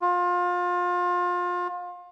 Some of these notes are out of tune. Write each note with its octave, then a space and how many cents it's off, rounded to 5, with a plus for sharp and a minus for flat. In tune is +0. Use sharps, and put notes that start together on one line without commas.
F4 +30